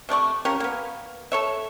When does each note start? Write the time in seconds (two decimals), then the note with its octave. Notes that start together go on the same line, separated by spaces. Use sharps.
0.09 C3 A3 D5 C#6
0.45 F3 C#4 G4 A#4
0.60 A#3 B3
1.32 A4 C#5 E5